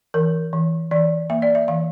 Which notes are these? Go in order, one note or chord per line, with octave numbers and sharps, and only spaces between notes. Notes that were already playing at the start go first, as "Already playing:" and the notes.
E3 A#4
E3
E3 D5
A#3 E5
D5
E5
E3 F5